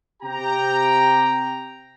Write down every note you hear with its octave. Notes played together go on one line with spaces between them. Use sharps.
C3 G4 G5 A#5